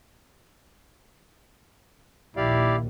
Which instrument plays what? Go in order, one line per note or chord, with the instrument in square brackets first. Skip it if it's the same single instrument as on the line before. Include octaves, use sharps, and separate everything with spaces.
[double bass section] A#1 D#2 [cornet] E4 [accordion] G4 D5 F5